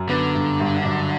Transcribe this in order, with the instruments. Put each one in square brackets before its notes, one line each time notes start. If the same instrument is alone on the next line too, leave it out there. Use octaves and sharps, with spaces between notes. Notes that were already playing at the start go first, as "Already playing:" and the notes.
Already playing: [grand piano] F#2
[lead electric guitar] D3 [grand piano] B3
[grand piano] G2
G2
F#2